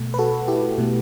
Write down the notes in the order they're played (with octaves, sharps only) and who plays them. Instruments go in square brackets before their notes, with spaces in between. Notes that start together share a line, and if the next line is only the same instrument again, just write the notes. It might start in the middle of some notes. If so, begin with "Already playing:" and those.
Already playing: [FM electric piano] B2 A3
B4
F#4 A4
E4 G4
B2 A3